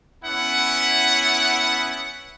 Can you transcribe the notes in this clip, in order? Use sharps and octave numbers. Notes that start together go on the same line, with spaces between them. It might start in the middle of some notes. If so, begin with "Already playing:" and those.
B3 C#4 E4 F#5